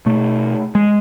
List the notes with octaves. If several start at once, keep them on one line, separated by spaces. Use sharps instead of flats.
B2 A3
G#3